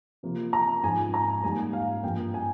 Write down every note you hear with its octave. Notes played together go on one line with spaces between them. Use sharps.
C3 F3 A#3
A#5
G#2 F3 G#3 G#5
A#5
G#2 G3 A#3 G#5
F5
G2 F3 A#3 G5
G#5